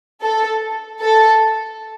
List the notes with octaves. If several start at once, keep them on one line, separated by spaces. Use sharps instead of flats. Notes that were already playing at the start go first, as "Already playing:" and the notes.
A4
A4